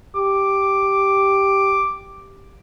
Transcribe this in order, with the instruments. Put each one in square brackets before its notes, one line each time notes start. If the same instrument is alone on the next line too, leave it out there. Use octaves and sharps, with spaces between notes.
[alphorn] G4 [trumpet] D6